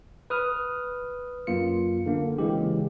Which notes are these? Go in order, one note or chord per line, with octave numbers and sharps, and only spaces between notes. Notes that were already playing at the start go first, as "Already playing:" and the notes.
B4 D#6 F6
F#2 A#3 F4 C#7
D3 A#3
C#3 E3 G#3 G4